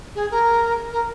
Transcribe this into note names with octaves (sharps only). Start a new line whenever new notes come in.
G#4
A#4
A#4